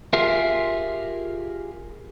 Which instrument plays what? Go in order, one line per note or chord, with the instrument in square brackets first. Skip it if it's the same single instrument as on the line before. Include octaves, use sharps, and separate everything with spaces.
[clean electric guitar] F4 G4 G#4 A#4 E5